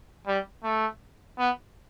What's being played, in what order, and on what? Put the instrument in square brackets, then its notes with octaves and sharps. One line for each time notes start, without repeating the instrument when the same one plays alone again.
[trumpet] G3
A3
B3